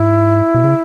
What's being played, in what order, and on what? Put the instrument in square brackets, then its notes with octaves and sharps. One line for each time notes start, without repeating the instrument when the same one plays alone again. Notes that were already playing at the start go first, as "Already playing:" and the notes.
Already playing: [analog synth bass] G#2 [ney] E4
[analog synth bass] B2
C#3